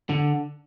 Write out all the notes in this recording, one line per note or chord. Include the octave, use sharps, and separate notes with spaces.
D3